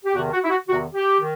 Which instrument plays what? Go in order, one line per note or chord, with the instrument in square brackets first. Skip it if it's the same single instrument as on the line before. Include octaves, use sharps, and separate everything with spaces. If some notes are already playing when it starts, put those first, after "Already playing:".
[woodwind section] G4
E2 C3 D#3 F#4
F#4
E4
F#4
E2 C3 D#3 F#4
G4
D#3